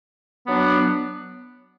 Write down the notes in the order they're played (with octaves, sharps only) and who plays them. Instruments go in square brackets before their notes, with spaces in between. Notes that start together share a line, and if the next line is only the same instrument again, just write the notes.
[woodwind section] F#3 B3 D4